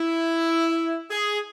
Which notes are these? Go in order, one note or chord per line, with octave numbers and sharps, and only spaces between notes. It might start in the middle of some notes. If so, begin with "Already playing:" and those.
Already playing: E4
G#4